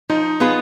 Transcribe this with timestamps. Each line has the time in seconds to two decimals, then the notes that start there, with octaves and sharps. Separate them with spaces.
0.09 F3 D#4
0.40 B3 F4 G#4 B4